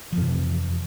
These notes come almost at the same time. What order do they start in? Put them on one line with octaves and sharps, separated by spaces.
F3 F2 C3 E3